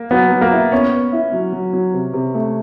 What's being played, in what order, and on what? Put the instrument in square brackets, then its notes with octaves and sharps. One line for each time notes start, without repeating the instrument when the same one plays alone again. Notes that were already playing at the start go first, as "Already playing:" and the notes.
Already playing: [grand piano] A#3
[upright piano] F#3 [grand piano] B3
[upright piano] F#3
[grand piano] A#3
[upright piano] E4
[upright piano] B3 [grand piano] C#4
[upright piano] B3
E4
F#3
F#3
F#3
C3
C3
A3